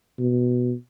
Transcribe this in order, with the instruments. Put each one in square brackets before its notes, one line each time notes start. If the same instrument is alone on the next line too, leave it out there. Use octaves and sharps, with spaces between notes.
[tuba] B2